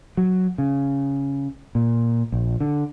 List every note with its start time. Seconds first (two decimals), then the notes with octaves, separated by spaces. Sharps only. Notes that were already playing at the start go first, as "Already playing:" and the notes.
0.17 F#3
0.58 C#3
1.75 A#2
2.32 A#1
2.60 D3